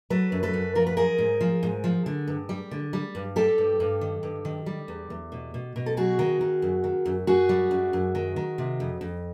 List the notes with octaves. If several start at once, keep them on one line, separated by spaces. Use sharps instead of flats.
F#3 A4 B4
F#2
A4 B4
F#2
F3 A#4
B4
F3 G#4 A#4
G#2
F3
G#2
F3
D3
G2
G3
D3
G3
G2
G3 G4 A4
G2
G2
D#3
G2
D#3
G3
E2
E2
B2
B2
B2
A4
F#3 F#4 G#4
D#3
D#3
F#2
D#3
F#2
F#2 F#4 G#4
G3
F#2
F#2
D#3
D#3
C3
F2
F2